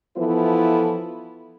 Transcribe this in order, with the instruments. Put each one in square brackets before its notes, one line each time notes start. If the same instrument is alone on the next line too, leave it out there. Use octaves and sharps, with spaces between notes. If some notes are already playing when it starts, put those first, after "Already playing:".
[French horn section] E3 F3 B3 E4 A4 B4